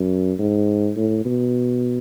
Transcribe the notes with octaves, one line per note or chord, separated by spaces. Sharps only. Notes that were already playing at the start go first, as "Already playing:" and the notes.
Already playing: F#2
G#2
A2
B2